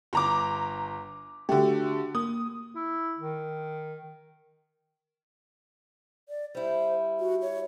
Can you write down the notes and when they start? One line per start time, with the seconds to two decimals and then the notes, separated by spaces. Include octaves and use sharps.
0.13 G1 A#5 D6
1.49 D3 A3 F#4 G4
2.15 A#3 D#6
2.76 E4
3.18 D#3
6.29 D5
6.55 G3 E4 C5
7.20 F#4
7.42 C#5